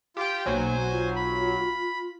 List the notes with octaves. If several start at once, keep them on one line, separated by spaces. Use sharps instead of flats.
F4 G4 G5
B1 F#3 A#3 C5 G#5
F4
B5